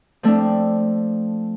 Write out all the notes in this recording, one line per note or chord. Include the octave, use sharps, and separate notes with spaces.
F3 A3 C4 D4